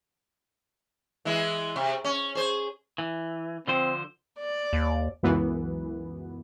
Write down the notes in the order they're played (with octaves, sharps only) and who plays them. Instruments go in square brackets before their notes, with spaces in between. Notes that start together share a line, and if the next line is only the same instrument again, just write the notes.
[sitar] E3 G#3 E4
C3
C#4
G#4 C5
[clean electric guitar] E3
[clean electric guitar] D3 F3 C5 [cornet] C4
[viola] D5
[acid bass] D#2
[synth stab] C#2 F#2 E3 B3